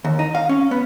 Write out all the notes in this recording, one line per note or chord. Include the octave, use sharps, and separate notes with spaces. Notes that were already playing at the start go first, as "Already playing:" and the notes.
D#2
D#4
F5
C#4
B3